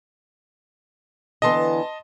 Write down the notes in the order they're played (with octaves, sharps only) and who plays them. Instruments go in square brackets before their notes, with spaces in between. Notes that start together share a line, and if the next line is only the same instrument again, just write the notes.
[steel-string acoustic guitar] D3 E3 B3 [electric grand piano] D#5 A5 C6